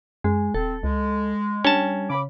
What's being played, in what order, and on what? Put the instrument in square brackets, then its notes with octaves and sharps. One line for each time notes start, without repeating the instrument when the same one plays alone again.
[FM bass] F#2 [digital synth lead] G#3
[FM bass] D#1 [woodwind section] C4 [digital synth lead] A4
[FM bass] C#2 [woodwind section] G#3
[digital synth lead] G3 [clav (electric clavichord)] C#4 A5 [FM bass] D4
[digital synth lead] C#3 [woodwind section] B5 D6